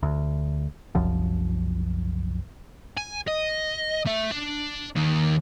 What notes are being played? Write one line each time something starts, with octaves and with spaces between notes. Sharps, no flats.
D2
F#1 C2 F#2 F3
G#5
D#5
A3 E5
D4
D#3 A#3